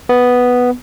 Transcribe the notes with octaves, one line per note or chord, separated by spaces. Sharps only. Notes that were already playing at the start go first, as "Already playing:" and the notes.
B3